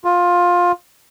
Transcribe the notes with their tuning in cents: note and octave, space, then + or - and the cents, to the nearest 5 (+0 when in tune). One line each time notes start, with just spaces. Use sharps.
F4 +15